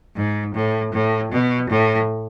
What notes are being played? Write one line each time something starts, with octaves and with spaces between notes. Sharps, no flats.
G#2
A2
A2
B2
A2